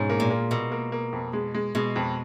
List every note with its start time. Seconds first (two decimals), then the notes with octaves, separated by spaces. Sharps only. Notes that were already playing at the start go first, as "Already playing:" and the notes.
Already playing: G#2 B2 C#4
0.10 A#3
0.20 A#2
0.30 A#3
0.51 B2 A#3
0.72 A#3
0.92 A#3
1.12 F2
1.33 G#3
1.55 G#3
1.75 B2 G#3
1.96 F2